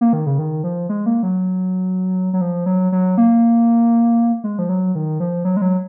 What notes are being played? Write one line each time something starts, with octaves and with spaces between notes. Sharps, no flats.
A#3
D#3
C#3
D#3
F3
G#3
A#3
F#3
F#3
F3
F#3
F#3
A#3
G#3
F3
F#3
D#3
F3
F#3
G#3
F#3